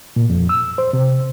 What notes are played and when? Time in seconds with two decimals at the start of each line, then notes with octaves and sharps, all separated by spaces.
0.16 A#2
0.30 F2
0.49 E6
0.78 C5
0.93 C3